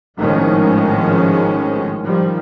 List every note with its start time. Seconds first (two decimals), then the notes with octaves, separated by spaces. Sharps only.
0.17 G#1 A2 D#3 F3 G#3 C#4
2.04 D#3 F3 G3